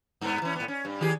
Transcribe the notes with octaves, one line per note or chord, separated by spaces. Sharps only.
G2 B3
E3 C#4
A2 B3
C#4
G2
D#3 G4 G#4